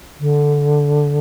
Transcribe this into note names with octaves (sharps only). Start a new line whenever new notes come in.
D3